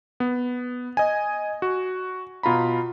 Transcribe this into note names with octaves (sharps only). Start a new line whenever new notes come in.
B3
D#5 G#5
F#4
B2 F4 A#5 B5